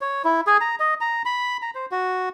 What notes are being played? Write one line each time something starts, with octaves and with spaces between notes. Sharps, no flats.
C#5
E4
G#4
A#5
D#5
A#5
B5
A#5
C5
F#4